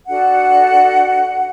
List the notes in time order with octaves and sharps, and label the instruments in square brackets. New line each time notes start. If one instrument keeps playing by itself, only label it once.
[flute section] D4 F#4 A4 F#5